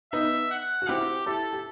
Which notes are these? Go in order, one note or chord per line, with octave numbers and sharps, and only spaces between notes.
B3 D#4 E5
F#5
F#4
C4 E4 G4
E4 G4 A4
G4